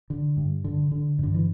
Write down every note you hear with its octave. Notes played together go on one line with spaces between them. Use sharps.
D3
G2
D3
D3
G2 D3
E3